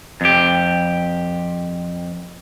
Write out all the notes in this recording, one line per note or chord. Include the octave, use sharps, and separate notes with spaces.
F2 G4